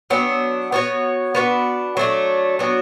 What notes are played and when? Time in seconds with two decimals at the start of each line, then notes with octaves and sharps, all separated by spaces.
0.10 F#3 B3 D4
0.72 B3 F#4 C#5
1.35 B3 D4 F#4 B4
1.97 F#3 A3 D4
2.59 F#3 B3 D4 F#4